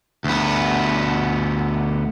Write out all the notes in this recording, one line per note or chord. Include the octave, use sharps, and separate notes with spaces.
D2 B3